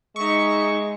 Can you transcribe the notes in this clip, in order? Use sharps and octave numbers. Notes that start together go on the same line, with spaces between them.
G#3 D#4 E5 C#6